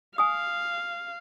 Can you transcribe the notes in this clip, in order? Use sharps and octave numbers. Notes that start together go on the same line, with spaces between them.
F5 G#5 D#6